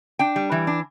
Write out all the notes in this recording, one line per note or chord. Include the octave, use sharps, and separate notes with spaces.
D4 G5
G3
E3
D4